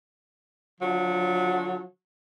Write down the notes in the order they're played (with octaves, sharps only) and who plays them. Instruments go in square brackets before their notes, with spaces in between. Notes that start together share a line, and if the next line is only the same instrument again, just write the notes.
[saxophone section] D3 F3 F#3 F#4